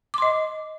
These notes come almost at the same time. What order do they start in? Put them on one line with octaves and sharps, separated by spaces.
D6 C6 D#5